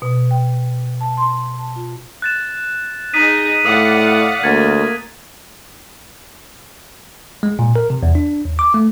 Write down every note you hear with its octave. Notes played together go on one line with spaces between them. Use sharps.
B2
G5
A5
C6
A5
F4
F#6 A6 E7
D#4 G#4 D#5 D#6 B6 D#7
A2 D5 F5 F#5 D#6
D2 A#3 G#6 A6
G#3
A#2
A#4
C3
E2
D4
D#2
D6
A3